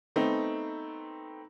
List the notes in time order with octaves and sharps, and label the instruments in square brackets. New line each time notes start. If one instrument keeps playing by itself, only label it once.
[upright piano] A3 B3 C4 D#4